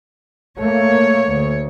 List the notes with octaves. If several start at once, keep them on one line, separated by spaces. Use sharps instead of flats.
A3 A#3 C#5
D2